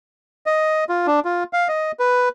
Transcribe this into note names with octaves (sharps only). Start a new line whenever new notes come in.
D#5
F4
D4
F4
F5
D#5
B4